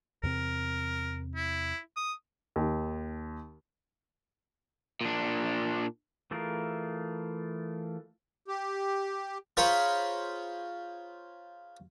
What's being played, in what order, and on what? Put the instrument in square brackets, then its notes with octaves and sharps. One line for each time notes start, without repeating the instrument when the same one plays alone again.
[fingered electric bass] E2 C3 C4 [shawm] A#4
[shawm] E4
D#6
[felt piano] D#2
[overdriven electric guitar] A#2 D4
[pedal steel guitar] E3 A3 F4 G#4 A#4
[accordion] G4
[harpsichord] F4 G#4 C5 C#5 A#5 B5